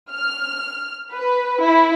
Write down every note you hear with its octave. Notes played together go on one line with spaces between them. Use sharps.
F6
B4
E4